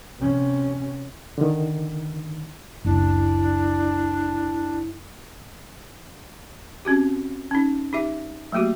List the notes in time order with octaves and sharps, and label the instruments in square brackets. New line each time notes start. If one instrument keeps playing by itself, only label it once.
[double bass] C3 C#4
[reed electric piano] D3 D#3
[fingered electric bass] F#1 C#2 [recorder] D4 [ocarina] E4
[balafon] C4 C#4 F#4 G4
C#4 D#4
D#4 G4 E5
F#3 A3 A#3 F#4 G4